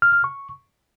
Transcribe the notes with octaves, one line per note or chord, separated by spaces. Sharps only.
F6
F6
C#6